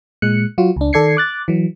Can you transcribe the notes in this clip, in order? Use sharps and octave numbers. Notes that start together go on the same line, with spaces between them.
A#2 G#3 F#6 C#7
F#3 F4 F#4
C#2 D4
D#3 A4 D5 G#6 C7 C#7
D6 F#6 A6
E3 F#3